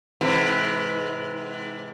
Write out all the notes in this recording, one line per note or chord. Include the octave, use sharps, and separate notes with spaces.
G#2 C3 E3